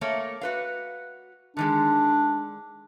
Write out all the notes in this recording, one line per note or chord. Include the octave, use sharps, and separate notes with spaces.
A3 A#3 C#5
F#4 B4 F5
D3 D#3 G#3 D4